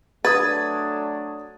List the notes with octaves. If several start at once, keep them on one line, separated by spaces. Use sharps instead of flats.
F#3 A3 D4 B4 D#6 G#6 A6